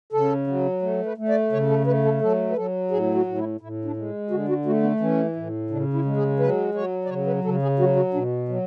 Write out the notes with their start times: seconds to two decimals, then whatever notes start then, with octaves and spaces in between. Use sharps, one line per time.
0.13 C#3 A4
0.47 F#3
0.82 A3
1.06 B4
1.18 A3
1.29 D5
1.52 C#3 C#5
1.70 A4
1.87 A3 B4
2.05 A4
2.21 F#3 A4
2.50 B4
2.56 F#3 A4
2.91 A2 G#4
3.15 F#4
3.27 A2
3.38 E4
3.61 A2 E4
3.85 D4
3.96 G#3
4.30 D3 F#4
4.49 F#4
4.66 A3 F#4
4.83 B3
5.00 E3 C#4
5.36 A2
5.70 C#3 D4
5.94 E4
6.05 G#3
6.17 G#4
6.39 F#3 B4
6.74 F#3 C#5
7.05 D5
7.09 C#3 C#5
7.27 B4
7.44 C#3 A4
7.62 G#4
7.79 F#3 F#4
7.96 F#4
8.14 B2 D4
8.49 F#3